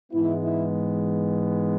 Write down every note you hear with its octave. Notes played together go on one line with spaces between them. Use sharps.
G#2 E3 G#3 B3 E4
E4